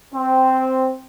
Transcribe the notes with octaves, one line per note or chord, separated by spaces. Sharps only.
C4